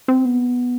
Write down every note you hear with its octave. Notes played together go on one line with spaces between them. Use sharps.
C4
B3